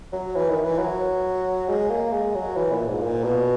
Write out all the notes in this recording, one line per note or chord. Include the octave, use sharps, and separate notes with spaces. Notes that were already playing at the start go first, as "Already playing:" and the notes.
F#3
E3
D#3
E3
F#3
G#3
A#3
G#3
F#3
E3
A#2
G#2
A#2
B2